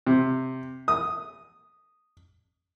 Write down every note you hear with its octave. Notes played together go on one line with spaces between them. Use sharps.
C3
D#6